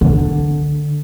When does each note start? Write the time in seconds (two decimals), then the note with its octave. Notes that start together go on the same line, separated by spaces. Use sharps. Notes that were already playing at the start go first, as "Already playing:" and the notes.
0.01 D3